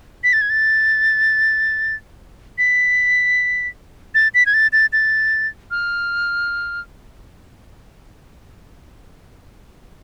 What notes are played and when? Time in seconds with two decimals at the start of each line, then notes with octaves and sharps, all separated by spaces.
0.24 B6
0.33 A6
0.41 G#6
0.50 A6
2.58 B6
4.15 A6
4.34 B6
4.46 G#6
4.54 A6
4.73 A6
4.93 A6
5.71 F6